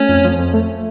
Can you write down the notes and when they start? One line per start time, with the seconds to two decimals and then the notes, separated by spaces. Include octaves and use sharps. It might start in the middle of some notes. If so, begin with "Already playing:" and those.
Already playing: A3 C#4
0.09 F2
0.24 F3
0.39 F2
0.53 A3